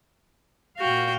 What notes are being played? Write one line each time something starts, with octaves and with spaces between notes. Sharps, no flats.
A#2 F#4 F5 G5